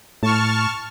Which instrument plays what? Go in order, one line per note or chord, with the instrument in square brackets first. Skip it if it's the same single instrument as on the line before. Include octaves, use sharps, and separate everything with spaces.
[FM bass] A2 [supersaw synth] A5 C#6 F6